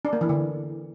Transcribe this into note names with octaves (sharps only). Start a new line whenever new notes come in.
D4
A#3
E3
D3